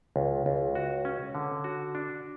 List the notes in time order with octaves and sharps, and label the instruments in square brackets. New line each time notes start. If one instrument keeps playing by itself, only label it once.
[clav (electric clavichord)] C#2
C#2
F#4
C#4
D3
F#4
D4